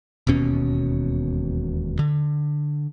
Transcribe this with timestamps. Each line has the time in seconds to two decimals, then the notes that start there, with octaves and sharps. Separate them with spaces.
0.27 E1 D#2 B2 C#4
1.99 D3